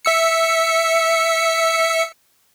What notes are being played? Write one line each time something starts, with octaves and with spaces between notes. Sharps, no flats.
E5 E6 C#7